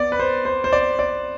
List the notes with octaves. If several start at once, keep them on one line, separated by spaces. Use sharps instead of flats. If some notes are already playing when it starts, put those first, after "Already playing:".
Already playing: B3 D5
B4
C5
C5
C5
D5
D5